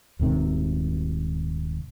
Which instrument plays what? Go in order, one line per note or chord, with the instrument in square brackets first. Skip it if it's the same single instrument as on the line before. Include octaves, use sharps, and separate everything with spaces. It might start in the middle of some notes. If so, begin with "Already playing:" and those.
[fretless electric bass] D#1 G#2 C3 D#3